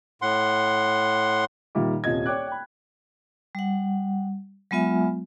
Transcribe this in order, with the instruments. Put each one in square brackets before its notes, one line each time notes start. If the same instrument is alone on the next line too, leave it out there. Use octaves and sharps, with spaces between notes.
[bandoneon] A2 F#5 C6
[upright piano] A#2 D#3 G3 E5 D6
D#1 C2 F4 D#5 G#6
C#5 D5 G5 D6 F#6
G5 B5
[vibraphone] G3 F#5
F#3 G#3 B3 F4 E5 G#5